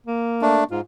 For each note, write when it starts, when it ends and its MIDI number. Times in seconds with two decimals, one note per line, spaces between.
0.07 0.63 58
0.42 0.64 57
0.42 0.64 62
0.71 0.81 44
0.71 0.80 65